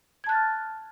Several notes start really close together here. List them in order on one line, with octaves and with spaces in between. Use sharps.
G#6 A5 F#6 A6 F6